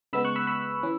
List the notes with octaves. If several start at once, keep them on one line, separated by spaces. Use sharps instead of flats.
C#3 G#3 B3 B5 E6
C#6 F#6
B5 E6
B5 E6
E3 C#4